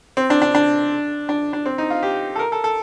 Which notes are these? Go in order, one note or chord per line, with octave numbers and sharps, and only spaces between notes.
C4
D4
D4
D4
D4
D4
C4
D#4
F4
G4
A4
A#4
A4
A4